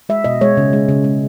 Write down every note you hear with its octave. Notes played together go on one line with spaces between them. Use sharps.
G#3 E5
B2 D#5
G#3 C#5
C#3
G#3
C#3
G#3